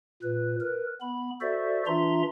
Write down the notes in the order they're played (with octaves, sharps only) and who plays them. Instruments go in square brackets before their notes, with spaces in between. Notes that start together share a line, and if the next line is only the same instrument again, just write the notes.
[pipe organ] A#2 B4
A#4 B4
B3 B5
F#4 A4 C5 D5 E5
E3 D4 F4 E5 A#5 C6